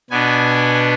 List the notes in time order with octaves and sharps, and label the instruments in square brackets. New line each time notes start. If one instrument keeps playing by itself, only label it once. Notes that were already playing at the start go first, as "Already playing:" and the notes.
[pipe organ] B2 B3 D4 G#5